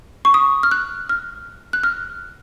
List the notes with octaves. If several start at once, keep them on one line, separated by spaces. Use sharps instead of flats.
C#6
D#6
F6
F#6
F6
F#6
F6